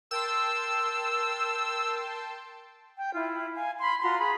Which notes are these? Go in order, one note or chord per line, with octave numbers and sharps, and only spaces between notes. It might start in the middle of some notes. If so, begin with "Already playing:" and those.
A#4 G5 A5 C6 E6
G5
E4 F4
F5 G#5
B5 C6
F4 F#4 A#5 C6
G#4 B5